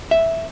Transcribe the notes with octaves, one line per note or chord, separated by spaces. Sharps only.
E5